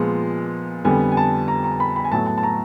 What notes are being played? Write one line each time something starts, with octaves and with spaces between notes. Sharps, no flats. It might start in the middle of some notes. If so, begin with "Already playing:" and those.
Already playing: A#2 F3 G#3 B3
F2 D3 G3 B3 G#5
G#5
A5
A#5
A#5
B5
B5
G#5
A2 F#3 B3 A5
A5
A5
A#5